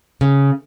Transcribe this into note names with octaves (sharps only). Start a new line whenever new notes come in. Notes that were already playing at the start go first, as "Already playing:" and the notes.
C#3